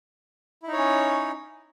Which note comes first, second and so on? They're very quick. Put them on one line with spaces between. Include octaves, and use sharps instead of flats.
E4 D#4 C#5 C#4